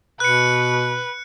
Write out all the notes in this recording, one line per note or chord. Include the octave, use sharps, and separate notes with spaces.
B2 B4 F#6 C#7